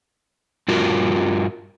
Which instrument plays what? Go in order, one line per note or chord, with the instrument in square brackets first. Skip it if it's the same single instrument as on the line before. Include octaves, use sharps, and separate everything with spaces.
[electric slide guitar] G2 F4 F#4 A#4